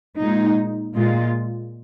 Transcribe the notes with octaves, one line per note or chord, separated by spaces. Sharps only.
A#2 G#3 D#4
A#2 G#3 F4